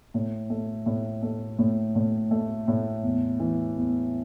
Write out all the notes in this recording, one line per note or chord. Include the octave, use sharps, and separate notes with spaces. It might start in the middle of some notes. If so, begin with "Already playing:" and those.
A2
A3
A2
A3
A2
A2
A3
A2
E2
E3
E2